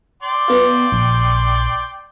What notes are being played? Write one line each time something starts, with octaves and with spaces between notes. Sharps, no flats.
D5 G5 C6
B3 F4
A#1